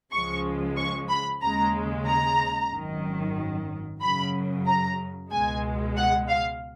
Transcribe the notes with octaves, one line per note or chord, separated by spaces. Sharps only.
C#2 C#3 F3 G#3 C#6
C#6
B5
D#2 C#3 G#3 A#5
A#5
G#1 F#2 D#3 F#3
F#2 C#3 F#3 B5
A#5
C#2 B2 G#3 G#5
F#5
F5